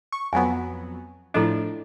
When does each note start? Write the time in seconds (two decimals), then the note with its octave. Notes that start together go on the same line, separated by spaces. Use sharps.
0.12 C#6
0.33 F2 F#3 B3 G#5
1.34 A2 F3 D4 E4 A4 D#5